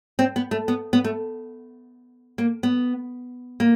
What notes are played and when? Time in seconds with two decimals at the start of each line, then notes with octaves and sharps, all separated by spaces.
0.19 C4
0.36 B3
0.51 A3
0.68 B3
0.93 B3
1.04 A3
2.38 A#3
2.63 B3
3.60 A#3